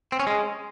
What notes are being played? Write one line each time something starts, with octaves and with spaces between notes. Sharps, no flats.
C4
C#4
G#3